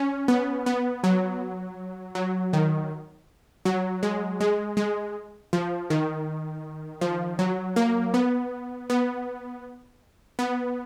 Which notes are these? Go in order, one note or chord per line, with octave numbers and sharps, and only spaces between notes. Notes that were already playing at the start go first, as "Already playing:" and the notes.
Already playing: C#4
B3
B3
F#3
F#3
D#3
F#3
G#3
G#3
G#3
F3
D#3
F3
F#3
A#3
B3
B3
B3